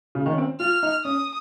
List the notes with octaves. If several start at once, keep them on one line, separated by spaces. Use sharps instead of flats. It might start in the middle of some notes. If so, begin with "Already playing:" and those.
C#3
D#3
C#4
C4
F4 F6
D#4
C#4 D#6